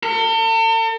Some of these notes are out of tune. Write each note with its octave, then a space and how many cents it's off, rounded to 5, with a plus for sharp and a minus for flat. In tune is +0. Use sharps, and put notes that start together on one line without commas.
A4 +45